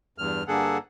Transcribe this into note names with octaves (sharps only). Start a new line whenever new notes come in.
E2 G2 F6
G2 D3 A#3 G#4 A4 F#5